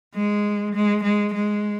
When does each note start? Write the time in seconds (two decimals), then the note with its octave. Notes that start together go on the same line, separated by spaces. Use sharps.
0.15 G#3
0.75 G#3
1.03 G#3
1.34 G#3